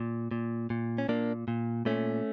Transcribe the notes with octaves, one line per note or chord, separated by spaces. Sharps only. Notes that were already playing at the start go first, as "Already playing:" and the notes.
Already playing: A#2
A#2
A#2
C#4
A#2 A#3 D4
A#2
A#2 A3 C#4